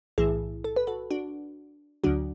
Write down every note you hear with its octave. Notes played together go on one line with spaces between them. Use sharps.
B1 A2 E3 E4 G#4
A4
B4
F#4 A4
D4 F#4
D2 D3 F#3 D4 F#4